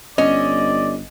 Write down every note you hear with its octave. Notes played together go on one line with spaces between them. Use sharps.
G1 C#4 D5 D#5